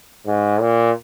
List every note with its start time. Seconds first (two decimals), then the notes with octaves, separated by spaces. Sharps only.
0.27 G#2
0.61 A#2